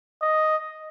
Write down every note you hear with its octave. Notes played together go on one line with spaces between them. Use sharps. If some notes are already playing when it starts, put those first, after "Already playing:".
D#5